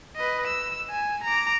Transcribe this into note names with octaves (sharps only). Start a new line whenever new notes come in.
B4 D#5
E6
G#5
A#5 D6